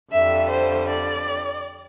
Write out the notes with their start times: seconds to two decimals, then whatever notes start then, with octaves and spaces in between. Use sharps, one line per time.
0.12 F2 D3 G3 E5
0.50 C5
0.89 D5